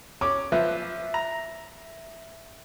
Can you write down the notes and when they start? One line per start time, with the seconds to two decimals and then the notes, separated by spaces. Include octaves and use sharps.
0.21 C#4 D6
0.52 F3 B4 E5
1.14 A#5